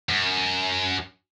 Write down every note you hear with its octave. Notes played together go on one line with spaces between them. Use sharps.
F#2